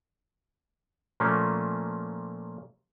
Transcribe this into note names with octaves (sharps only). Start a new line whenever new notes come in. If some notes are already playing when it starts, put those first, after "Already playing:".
A#2 F3 A3 A#3 C#4